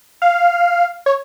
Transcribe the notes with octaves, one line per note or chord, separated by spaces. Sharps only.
F5
C#5